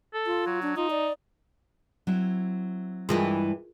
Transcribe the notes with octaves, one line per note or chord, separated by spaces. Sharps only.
A4
F4
F#3
D4
D#4 F4
D5
F#3 C4 E4
G2 E3 G#3 F4 G#4 A#4